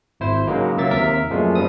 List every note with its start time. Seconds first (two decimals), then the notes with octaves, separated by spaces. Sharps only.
0.20 G#1 E4 C5
0.47 C#3 F#3 G#3 A#3 D#4
0.77 C#2 F#3 A#3 E5 A6
0.91 D#2 C3 A#4 E5 B6
1.30 F#2 A#2 F3 G#3 A3
1.55 C#3 G3 C4 D#6